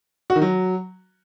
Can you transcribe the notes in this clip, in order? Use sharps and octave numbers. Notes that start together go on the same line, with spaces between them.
F#4
D#3
F#3